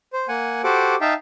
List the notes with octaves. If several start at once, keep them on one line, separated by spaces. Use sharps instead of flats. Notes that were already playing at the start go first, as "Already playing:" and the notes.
C5
A#3 F#5 G#5
F#4 G4 A4 C5 F#5 D6
D#4 E5 F5 G5 A5